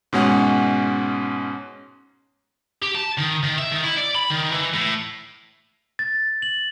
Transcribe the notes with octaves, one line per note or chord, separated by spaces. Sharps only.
G#2 B2 G#3 C#4 F#5
G4
A5
D#3
D#3
E5
D#3
E4
D5
B5
D#3
E3
A2
A6
F#7